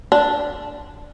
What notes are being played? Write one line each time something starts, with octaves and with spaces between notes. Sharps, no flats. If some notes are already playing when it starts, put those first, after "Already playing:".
D4